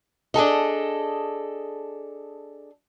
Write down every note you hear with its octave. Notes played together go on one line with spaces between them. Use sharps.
D4 G#4 A4 D#5